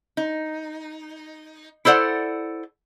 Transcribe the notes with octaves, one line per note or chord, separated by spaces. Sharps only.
D#4
E4 A4 C5 D5 F#5